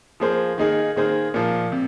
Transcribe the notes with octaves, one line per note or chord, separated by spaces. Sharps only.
F3 A#3 G#4 C5
D#3 A#3 D#4 G#4
D#3 A#3 G#4 C5
A#2 F3 A#3
C3